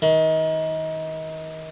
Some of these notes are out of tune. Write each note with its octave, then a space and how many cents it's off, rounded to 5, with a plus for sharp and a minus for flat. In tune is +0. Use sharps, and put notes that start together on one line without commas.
D#3 +30